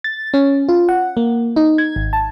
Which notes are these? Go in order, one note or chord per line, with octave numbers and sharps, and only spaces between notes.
A6
C#4
F4
F#5
A#3
D#4
G#6
G#1
A5